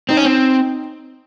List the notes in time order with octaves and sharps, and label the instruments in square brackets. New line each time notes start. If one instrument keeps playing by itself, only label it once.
[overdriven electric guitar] C4 [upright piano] D#4
[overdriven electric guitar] C#4
C4